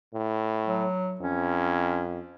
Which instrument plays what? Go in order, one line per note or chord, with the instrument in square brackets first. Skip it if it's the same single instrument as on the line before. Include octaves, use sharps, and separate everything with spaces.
[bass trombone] A2
[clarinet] F#3
[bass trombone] F2 [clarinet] C#4